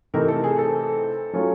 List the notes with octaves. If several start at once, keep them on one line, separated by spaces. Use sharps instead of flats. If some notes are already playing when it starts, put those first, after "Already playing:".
C3 E3 A3 C4 D#4 A#4
A4
G#4
A4
F#3 A3 C#4 F4